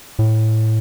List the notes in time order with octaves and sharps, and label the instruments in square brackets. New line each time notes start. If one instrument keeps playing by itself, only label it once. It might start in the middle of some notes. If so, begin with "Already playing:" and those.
[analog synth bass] A2